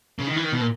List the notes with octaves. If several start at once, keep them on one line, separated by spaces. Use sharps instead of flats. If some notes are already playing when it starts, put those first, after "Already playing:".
C#3
D#3
E3
D#3
B2
A#2